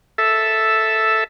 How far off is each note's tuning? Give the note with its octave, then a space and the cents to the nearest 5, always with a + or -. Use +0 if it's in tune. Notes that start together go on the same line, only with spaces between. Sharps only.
A4 +0 E5 +0